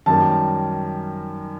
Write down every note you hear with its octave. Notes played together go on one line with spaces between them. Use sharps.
F#2 D#3 G3 A#3 A5